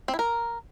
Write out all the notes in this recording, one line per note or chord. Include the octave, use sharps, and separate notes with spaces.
C4
E4
A#4